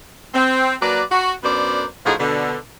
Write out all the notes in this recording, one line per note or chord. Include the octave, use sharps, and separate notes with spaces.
C4
F#3 A#3 B4 D5
F#4
F#2 B3 D4 A#4 C5 D5
A2 D3 F3 D#4 F#4 G#4
B2 D3